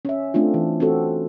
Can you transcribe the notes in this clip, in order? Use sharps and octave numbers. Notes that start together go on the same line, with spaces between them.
C#4 E5
A3 C4 D4 F4
E3
C4 C#4 F#4 A4